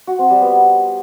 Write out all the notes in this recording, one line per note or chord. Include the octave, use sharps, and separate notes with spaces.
F#4
C4
G3
B3